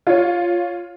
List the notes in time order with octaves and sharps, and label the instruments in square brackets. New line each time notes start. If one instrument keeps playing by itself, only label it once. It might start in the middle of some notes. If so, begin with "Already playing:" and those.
[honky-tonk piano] F4 C#5